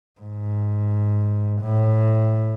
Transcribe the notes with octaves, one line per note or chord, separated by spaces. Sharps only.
G#2
A2